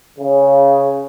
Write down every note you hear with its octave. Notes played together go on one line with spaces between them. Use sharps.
C#3